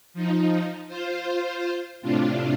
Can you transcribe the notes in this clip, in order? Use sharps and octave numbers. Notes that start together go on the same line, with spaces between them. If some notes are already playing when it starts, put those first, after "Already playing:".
F3 D#4
F4 C5
A2 C3 D4 F4